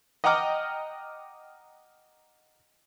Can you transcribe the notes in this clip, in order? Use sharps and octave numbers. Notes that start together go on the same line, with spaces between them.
D#5 F#5 G5 A#5 D6 F6